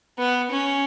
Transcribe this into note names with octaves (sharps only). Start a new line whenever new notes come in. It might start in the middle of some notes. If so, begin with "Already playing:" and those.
B3
C#4